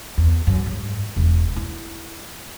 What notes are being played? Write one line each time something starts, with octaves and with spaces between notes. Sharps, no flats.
E2
F#2
G#2
E1
E4